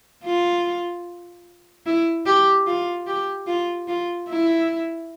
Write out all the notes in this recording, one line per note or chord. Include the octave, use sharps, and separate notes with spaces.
F4
E4
G4
F4
G4
F4
F4
E4